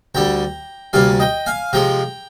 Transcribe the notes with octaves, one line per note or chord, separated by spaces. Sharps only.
D2 D3 G3 G5 A#5
D2 C3 G3 A#3 F5 G#5
D#5 G5
F5 G#5
C3 F3 G#3 G5 A#5